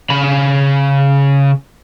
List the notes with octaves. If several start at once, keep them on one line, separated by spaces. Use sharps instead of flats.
C#3 B5